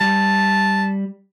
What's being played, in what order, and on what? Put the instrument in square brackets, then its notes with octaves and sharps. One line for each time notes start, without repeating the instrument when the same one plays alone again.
[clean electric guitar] G3 [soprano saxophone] A5